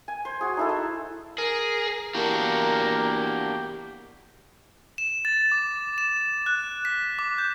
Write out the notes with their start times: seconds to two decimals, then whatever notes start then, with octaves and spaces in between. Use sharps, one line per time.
0.08 G#5
0.25 C5
0.41 F#4 G#4
0.57 D#4 E4 A4
0.69 E5
1.38 G#4 A#4
2.14 E2 A#3 D4 F#4 G4 A#4
4.98 E7
5.25 A6
5.52 D6
5.98 E7
6.46 F#6
6.85 B6
7.19 D6
7.38 G6